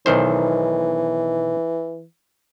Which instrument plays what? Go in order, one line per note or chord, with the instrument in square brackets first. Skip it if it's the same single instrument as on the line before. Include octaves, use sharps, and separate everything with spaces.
[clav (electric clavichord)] B1 D#3 C5 [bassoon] E3